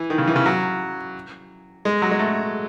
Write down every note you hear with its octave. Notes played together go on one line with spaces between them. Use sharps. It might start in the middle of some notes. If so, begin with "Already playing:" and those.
Already playing: E3
D#3
C#3
E3
C#3
F#3
G#3
F#3
G#3
A3